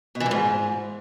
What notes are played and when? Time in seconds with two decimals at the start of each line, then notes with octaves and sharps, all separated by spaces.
0.15 B2
0.20 E3
0.26 G2
0.31 G#2